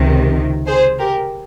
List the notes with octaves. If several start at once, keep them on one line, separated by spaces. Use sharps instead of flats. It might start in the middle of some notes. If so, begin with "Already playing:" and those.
Already playing: C#2 C3 D#3
G#4 C5
G4 A#4